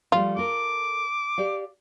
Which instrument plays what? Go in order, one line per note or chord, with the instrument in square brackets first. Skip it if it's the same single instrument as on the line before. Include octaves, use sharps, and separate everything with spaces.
[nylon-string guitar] F3 G3 A3 [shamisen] F4
[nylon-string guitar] A4 A#4 [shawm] D6
[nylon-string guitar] G4 D5 F5